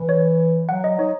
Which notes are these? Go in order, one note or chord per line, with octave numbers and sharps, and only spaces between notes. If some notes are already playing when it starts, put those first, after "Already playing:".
Already playing: E3
C#5
F#3 F#5
D#5
D#4 C#5